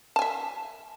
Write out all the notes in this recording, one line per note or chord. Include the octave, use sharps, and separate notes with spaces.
E5 G#5 A5